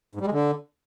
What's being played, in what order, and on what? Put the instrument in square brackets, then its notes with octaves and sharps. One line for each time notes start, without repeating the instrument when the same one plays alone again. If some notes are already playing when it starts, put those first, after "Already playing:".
[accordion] G#2
G3
G#3
D3